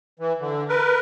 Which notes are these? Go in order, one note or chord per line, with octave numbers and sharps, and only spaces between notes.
E3
D3
A#4 B4